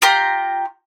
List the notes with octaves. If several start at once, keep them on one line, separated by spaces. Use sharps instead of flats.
F4 G4 A#5 C6